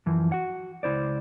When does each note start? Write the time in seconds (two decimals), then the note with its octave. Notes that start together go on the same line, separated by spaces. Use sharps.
0.06 F#2 E3 F3
0.32 F#4 F#5
0.83 C#2 E4 C5 D5